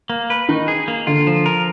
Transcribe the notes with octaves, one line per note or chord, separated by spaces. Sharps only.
A#3
B4
D#3 D#4
G#4
A#3
D3 F4
F3
A#4